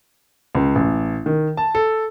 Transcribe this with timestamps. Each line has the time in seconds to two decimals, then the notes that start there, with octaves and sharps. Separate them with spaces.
0.55 C#2
0.75 A1
1.26 D#3
1.57 A5
1.75 A4